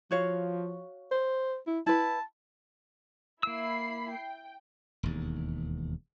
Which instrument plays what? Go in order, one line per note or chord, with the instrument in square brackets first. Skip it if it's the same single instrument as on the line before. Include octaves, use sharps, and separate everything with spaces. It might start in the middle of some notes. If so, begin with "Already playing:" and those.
[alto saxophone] F3 [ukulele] F#4 C#5 F5
[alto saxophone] C5
E4
[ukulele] E4 B4 [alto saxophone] A5
[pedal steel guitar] A#3 E6 [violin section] E4 B5 C7
[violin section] G5
[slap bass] E1 D#2